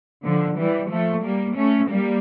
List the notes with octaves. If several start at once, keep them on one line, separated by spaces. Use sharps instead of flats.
D3 F3
E3 G3
F3 A3
G3 A#3
A3 C#4
G3 A#3